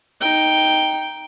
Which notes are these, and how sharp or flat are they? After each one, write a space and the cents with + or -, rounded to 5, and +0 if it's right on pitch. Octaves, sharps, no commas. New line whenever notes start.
D#4 +0 G5 +0